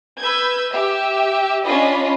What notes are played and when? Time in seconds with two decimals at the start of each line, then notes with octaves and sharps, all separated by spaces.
0.20 B4 B5 E6 G6 G#6
0.73 G4 E5
1.64 C#4 D4 F4 D#5 B5